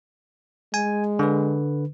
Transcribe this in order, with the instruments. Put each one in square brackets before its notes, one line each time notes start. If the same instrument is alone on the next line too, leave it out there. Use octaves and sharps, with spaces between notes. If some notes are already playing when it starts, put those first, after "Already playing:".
[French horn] G#3 [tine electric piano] G#5
[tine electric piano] D3 B4